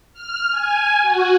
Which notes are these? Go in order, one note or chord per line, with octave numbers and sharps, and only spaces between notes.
F6
G#5
F#4